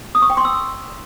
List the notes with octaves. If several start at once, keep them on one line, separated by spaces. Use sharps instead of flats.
D#6
C#6
G5
C6
E6